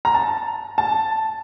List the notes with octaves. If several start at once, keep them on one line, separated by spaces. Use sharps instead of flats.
A#5
A5
A5